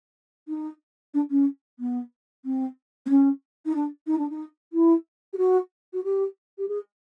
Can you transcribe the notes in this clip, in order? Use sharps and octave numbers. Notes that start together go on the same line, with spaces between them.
D#4
D4
C#4
B3
C4
C4
C#4
D#4
D4
D#4
D4
D#4
E4
G4
F#4
F#4
G4
G4
G#4